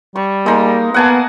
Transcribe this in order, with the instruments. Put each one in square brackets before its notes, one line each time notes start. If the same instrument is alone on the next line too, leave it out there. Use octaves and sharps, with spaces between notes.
[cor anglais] G3 [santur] C#6
[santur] G#3 D#4 [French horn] A#3
[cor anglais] A#3 [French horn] B3 [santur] F#5 G#5 A5